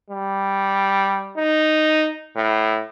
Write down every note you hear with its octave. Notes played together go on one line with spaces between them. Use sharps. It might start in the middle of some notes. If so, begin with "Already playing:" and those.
G3
D#4
A2